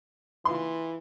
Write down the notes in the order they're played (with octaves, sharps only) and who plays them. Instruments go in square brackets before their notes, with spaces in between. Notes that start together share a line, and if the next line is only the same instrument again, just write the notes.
[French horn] E3 [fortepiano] F4 C6